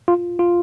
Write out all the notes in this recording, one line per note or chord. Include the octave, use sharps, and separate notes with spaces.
F4
F4